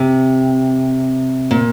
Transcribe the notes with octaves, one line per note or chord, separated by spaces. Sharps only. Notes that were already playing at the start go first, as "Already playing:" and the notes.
Already playing: C3
A#2